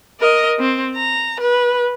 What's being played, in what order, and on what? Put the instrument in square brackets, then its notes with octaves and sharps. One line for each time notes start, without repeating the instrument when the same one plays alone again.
[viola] A#4 D#5
C4
A#5
B4